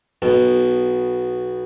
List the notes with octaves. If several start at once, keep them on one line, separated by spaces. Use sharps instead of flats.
B1 B2